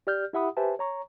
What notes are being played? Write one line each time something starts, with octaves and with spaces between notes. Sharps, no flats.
G4 D5 F6 G6
E4 G4 E5 F#5 B5 D#6
G4 B4 C5 E5 G#5 A5
C#5 A#5 C#6